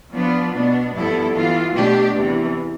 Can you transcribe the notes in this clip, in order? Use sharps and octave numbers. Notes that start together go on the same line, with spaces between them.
F3 B3 D4 F4 B4
B2 B3 D4
G2 F3 B3 E4 A4
E3 B3 F4
B2 A3 D4 G4
E2 C3 E3